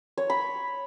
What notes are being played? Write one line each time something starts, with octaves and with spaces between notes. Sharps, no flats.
C#5
B5